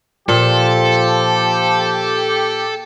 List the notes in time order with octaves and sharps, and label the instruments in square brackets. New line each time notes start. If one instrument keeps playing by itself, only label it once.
[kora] A#2 [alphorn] F3 [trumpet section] G4 [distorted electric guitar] A4